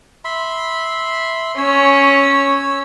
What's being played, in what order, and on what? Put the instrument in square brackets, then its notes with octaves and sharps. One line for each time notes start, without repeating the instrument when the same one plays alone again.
[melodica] E5 B5 C6
[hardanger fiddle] C#4 [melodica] C#5 E6